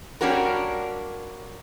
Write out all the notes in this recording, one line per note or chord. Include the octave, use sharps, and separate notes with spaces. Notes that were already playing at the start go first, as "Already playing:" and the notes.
G3 A#3 C#4 D4 F#4 A#4